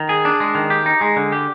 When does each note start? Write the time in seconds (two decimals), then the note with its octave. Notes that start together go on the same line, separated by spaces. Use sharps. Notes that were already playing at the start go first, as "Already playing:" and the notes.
Already playing: D#3
0.09 G#4
0.25 D4
0.40 G#3
0.55 D#3
0.70 G4
0.86 D#4
1.01 G#3
1.16 D3
1.32 G4